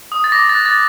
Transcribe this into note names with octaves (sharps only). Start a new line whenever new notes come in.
D#6
A6
D6 A#6
A6
F#6
A6